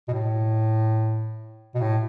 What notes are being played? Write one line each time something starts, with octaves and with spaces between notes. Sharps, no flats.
B2
A2
B2
A2